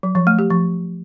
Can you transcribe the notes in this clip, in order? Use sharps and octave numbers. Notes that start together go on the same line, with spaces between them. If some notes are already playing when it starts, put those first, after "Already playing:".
F#3
F3
A3
G4
F3